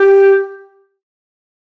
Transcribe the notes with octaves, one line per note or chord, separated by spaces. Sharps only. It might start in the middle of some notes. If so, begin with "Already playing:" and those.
Already playing: G4